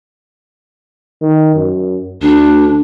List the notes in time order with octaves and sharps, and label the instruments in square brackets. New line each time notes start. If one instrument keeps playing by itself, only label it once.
[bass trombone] D#3
F#2
[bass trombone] D2 [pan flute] D4